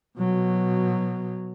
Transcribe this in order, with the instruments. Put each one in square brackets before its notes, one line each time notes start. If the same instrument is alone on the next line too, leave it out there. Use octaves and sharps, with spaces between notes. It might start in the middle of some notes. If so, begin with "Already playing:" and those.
[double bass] B2 F#3